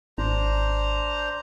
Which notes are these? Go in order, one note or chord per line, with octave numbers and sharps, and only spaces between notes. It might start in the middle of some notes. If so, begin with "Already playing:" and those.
G#1 D4 C5 A#5